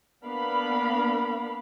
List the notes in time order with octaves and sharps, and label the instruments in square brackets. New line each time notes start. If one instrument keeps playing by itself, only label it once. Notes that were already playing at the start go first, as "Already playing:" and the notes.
[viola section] A#3 B3 D4 A#4 F5 B5